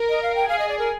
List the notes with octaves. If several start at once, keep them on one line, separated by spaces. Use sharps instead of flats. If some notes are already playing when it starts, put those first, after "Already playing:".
Already playing: A#4
D#5
F5
G5
G#4 F5
D#5
D5
A#4